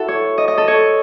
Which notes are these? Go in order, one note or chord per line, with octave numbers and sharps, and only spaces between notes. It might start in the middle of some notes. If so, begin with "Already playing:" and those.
Already playing: E4 F#4 A4
C#5
D#5
D#5
A4
C#5